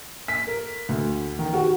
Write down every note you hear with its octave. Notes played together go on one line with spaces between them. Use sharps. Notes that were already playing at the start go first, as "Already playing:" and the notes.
B6
A#4
D2
D#3
F#4